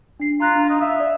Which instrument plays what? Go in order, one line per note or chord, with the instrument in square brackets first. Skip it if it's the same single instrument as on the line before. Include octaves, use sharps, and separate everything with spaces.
[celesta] D4 C7
[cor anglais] F4 [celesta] A#5 F#6 A#6
[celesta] D4
[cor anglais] D#4
[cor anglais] E5 [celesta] F5
[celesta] D5 D#6